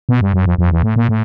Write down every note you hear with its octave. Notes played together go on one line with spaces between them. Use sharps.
B2
G2
F#2
F2
F2
E2
A2
A#2
A2